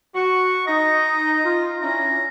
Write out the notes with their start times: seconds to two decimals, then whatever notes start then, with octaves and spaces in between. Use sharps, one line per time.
0.15 F#4 C#6
0.67 D#4 D#5 A#5
1.45 F4
1.82 C#4 D4 E4 A#5